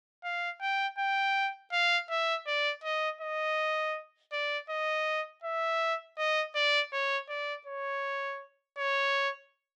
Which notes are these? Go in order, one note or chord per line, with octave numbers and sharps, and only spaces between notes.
F5
G5
G5
F5
E5
D5
D#5
D#5
D5
D#5
E5
D#5
D5
C#5
D5
C#5
C#5